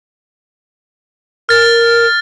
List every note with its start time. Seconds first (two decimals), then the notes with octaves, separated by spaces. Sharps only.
1.49 A#4 F6 A6